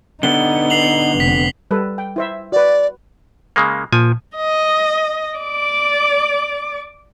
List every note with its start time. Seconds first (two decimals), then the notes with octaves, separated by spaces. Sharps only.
0.23 D3 B3 D#4 G7
0.70 C7 F7 F#7
1.20 F1 B6
1.71 G3 A4 B4
1.98 G5
2.16 E4 C5 E5
2.52 F#4 B4 D5
3.56 C#3 G#3 A#3
3.93 A#2 F3 G#5
4.36 D#5
5.38 D5 D6